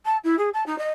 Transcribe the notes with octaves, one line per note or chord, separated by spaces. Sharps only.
A5
E4
G#4
A5
D#4
D#5